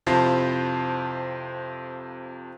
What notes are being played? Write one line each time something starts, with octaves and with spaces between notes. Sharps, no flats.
F2 C3 E4 F4 C5 A5